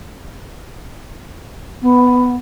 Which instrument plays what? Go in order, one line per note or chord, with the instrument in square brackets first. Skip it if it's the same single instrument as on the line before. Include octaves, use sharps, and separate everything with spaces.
[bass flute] B3